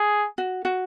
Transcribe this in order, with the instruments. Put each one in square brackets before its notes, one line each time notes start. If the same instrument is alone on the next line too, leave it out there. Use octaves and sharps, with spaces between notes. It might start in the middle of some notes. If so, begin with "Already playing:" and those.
Already playing: [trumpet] G#4
[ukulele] F#4
F#4